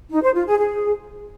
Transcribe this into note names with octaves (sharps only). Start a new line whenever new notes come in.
D#4
C5
F4
G#4
G#4